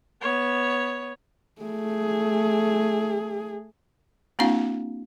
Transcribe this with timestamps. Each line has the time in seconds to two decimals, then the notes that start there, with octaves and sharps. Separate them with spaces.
0.21 B3 C#5
1.62 A3 G#4
4.39 A#3 C4 D4 E4 F#4 F5